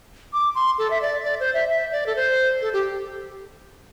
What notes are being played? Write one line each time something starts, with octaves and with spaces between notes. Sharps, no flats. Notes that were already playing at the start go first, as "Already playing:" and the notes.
D6
C6
A4
E5
D5
D5
C5
E5
E5
D5
A4
C5
A4
G4